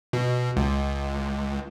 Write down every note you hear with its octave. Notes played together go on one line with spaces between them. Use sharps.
B2
C#2